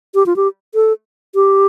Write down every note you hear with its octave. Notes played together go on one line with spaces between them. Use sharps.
G4
F4
G4
A4
G4